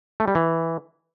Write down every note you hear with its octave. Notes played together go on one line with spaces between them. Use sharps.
A3
G3
E3